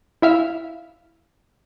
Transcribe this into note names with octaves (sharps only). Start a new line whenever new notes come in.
E4 E5 F5